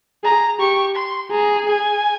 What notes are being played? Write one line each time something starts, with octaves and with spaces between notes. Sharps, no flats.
G#4 A#5
G4 C#6
C6
G#4 A#5
G#5